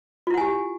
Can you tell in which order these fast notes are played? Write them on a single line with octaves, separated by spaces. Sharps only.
F4 E4 F#5 G#5 G4